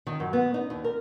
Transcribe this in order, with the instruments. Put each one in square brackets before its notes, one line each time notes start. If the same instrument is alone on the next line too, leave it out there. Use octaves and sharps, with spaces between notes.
[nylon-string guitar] D#3
F#2
B3
D#4
D#2
A#4